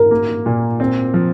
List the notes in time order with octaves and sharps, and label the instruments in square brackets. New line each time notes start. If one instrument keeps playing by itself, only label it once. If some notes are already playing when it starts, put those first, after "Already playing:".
Already playing: [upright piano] A#4
[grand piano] A#3
A#2
C4
F3